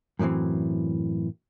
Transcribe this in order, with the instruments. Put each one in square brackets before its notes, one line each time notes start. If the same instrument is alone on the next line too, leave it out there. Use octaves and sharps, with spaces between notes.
[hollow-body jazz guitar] F#2 A2 D3 E3 C4